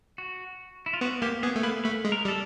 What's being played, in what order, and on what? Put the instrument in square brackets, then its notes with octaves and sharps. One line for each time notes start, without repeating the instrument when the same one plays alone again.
[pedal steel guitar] F#4
E4
F4
[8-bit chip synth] B3 [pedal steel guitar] F#4
[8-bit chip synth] A#3 [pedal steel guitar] G4
[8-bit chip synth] B3 [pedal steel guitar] G#4
[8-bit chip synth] A3
[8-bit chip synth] A#3 [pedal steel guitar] B4
[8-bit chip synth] A3 [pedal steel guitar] B4
[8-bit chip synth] G#3
[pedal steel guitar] A#4
[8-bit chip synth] G3
[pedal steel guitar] A4